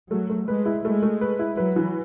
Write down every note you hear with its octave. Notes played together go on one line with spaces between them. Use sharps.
F#3 A3
A3
G#3 B4
E4
G#3 A3
A3
B4
E4
F#3 B4
E3